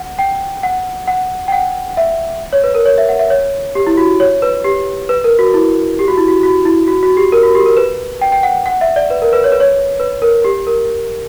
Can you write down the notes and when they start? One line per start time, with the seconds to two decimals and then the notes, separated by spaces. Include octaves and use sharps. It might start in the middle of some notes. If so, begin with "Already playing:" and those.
Already playing: F#5
0.19 G5
0.63 F#5
1.08 F#5
1.48 G5
1.52 F#5
1.89 F#5
1.97 E5
2.53 C#5
2.64 B4
2.75 A#4
2.86 C#5
2.98 E5
3.09 F#5
3.19 E5
3.30 C#5
3.75 G4
3.87 E4
3.97 F#4
4.20 C#5
4.42 B4
4.64 G4
5.09 B4
5.24 A#4
5.39 F#4
5.54 E4
5.99 G4
6.08 F#4
6.18 E4
6.28 F#4
6.43 F#4
6.65 E4
6.88 F#4
7.03 F#4
7.17 G4
7.32 A#4
7.43 F#4
7.55 G4
7.66 A#4
7.77 B4
8.21 G5
8.32 G5
8.43 F#5
8.66 F#5
8.81 E5
8.96 D5
9.10 B4
9.22 A#4
9.33 B4
9.44 C#5
9.52 B4
9.60 C#5
10.00 B4
10.22 A#4
10.44 G4
10.67 A#4